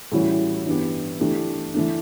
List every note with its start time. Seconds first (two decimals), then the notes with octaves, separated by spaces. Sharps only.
0.12 A2 E3 G3 C#4 F#4
0.66 G2 E3 B3 D4 G4
1.20 E3 A3 D4 G4
1.74 E3 A3 D4